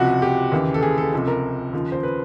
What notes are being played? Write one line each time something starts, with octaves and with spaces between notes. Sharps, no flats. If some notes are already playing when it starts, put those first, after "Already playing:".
Already playing: C#2 C3 F3 F#4
G4
D#2 C#3 E3
A4
G#4
A4
C#2 C3 F3 A4
A#4
D#2 C#3 F3
C5
B4